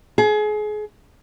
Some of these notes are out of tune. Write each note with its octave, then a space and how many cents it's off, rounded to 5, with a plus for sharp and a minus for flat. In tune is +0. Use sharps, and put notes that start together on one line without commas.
G#4 +30